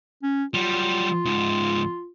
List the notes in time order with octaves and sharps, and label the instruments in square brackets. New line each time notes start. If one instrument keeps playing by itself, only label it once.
[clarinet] C#4
[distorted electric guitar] F#3 G3 [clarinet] F4
[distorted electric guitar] C#2 G#2